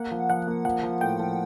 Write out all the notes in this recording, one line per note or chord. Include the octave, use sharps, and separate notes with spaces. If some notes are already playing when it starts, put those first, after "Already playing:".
Already playing: A#3 F#5
F3
F3 F#5
A#3
F3 F#5
F3
A2 G5
F3